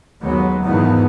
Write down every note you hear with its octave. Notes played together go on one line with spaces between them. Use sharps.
D#2 F#3 G#3 B3
E2 G#2 D#3 F3 B3